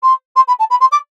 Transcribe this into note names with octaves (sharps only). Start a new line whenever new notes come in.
C6
C6
B5
A5
B5
C6
D6